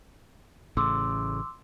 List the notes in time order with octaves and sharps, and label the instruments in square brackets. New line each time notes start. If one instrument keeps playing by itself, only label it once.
[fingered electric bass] A1 A2 C#3 [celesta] C6 D6 E6